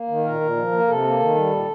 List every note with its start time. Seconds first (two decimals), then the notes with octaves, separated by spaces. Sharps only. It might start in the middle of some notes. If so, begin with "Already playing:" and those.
Already playing: A#3
0.08 D#3
0.24 A#2 A#4
0.40 A#2
0.57 F3
0.72 A#3
0.87 C3 A4
1.04 A#3
1.20 D#3
1.35 G3
1.52 A#2